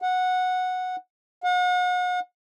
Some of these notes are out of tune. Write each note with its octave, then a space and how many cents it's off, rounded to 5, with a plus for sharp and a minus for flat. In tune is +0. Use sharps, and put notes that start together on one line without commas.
F#5 -10
F#5 -40